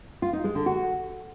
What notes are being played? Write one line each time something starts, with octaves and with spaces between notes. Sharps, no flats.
F4
D#4
G#3
D3
F#4